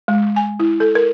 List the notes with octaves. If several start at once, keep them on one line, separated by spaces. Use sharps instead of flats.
G#3
G#5
E4
A4
A#4